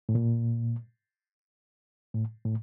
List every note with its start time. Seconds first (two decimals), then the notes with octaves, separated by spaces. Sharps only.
0.09 A2
0.15 A#2
2.15 A2
2.45 A2